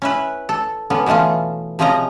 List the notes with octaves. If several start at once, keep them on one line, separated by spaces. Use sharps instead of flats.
C#4 E4 B4
A4
D3 B3 C#4
B2 E3 A3 C#4 F4
C3 F3 G#3 C#4 D#5 A#5